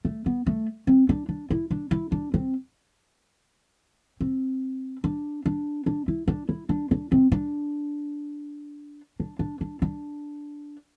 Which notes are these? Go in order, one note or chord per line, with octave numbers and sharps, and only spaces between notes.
A3
B3
A3
C4
D4
D4
E4
D4
E4
D4
C4
C4
D4
D4
D4
E4
D4
E4
D4
D4
C4
D4
D4
D4
D4
D4